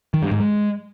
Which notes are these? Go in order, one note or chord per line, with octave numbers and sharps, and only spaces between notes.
D#3
G2
G#2
G#3